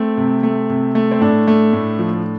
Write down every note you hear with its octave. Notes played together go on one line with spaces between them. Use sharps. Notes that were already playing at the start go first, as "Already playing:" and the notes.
Already playing: A3 C4
C3
A3
C3
A3
C4
A2 D4
A3
A2
F3